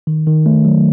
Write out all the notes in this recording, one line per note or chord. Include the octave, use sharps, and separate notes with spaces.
D#3
D#3
A3
F#3